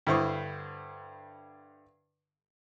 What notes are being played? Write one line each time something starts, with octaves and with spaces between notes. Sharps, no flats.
G2 D3 E4 C5 C#6 D#6